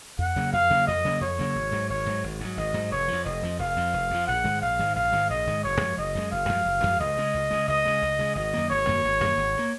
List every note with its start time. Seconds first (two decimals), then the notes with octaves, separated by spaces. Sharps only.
0.19 F2 F#5
0.36 C#3 F#3 A#3
0.53 F2 F5
0.70 C#3 F#3 A#3
0.87 F2 D#5
1.05 C#3 F#3 A#3
1.21 F2 C#5
1.39 C#3 F#3 A#3
1.55 G#1
1.72 G#2 F#3
1.90 G#1 C#5
2.06 G#2 F#3
2.24 G#1
2.41 G#2 F#3
2.57 G#1 D#5
2.74 G#2 F#3
2.91 F1 C#5
3.08 F2 F3
3.25 F1 D#5
3.43 F2 F3
3.59 F1 F5
3.77 F2 F3
3.93 F1
4.11 F2 F3
4.27 A#1 F#5
4.44 G#2 D#3 G#3
4.62 A#1 F5
4.79 G#2 D#3 G#3
4.95 A#1 F5
5.12 G#2 D#3 G#3
5.30 A#1 D#5
5.47 G#2 D#3 G#3
5.64 F#1 C#5
5.81 F#2 F3 G#3
5.97 F#1 D#5
6.15 F#2 F3 G#3
6.31 F#1 F5
6.49 F#2 F3 G#3
6.66 F#1
6.83 F#2 F3 G#3
7.00 C#2 D#5
7.17 C#3 G#3
7.34 C#2
7.51 C#3 G#3
7.68 C#2 D#5
7.86 C#3 G#3
8.02 C#2
8.19 C#3 G#3
8.35 G#1 D#5
8.54 F#2 D#3 A#3
8.70 G#1 C#5
8.87 F#2 D#3 A#3
9.05 G#1
9.21 F#2 D#3 A#3
9.37 G#1
9.58 D#3 A#3